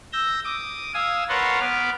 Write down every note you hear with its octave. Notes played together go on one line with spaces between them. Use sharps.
E6 G6 A#6
D6 D#6
F5 G#5 D#6 E6
A#4 B4 C#5 F#5 A5 C6
B3 B4 D6 F6